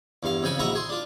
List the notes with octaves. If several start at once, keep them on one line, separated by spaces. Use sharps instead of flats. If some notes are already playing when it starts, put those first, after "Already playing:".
E2 G2 F5
F2 C#3 G5 G#5 B5
A#1 E4 F#4 D#5 A#5 C#6
G#4 C6
D4 F4